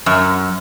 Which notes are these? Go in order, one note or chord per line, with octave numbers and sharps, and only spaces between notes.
F#2